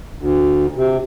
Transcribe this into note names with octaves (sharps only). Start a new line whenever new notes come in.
D2
C3